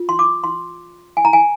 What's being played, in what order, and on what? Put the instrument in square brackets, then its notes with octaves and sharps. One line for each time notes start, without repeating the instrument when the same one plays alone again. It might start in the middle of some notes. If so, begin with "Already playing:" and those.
Already playing: [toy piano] F4
C6
D6
C6
G#5
A#5
G#5